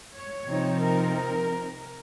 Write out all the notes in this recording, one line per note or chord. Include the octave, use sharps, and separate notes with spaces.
C#5
C3 F3 C4 D#4
A#4